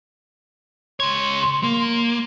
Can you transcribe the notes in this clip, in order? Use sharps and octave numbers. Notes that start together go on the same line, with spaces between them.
C#2 C#5 C6
A#3